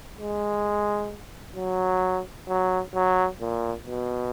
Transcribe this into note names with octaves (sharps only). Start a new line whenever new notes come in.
G#3
F#3
F#3
F#3
A#2
B2